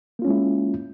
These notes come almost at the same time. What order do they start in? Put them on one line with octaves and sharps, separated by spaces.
A#3 F4 C#4 G#3 E4